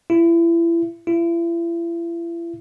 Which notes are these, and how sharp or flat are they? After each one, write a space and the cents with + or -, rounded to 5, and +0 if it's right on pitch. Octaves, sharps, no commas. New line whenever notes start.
E4 +30
E4 +40